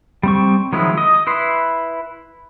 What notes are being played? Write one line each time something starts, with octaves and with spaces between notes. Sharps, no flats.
G3 C4 C#6
D#3 F3 F#3 G#3 E4
D#5
E4 B4 C6